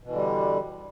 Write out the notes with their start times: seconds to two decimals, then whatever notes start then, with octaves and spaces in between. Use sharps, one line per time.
0.03 B2
0.07 E3
0.11 D3
0.15 G3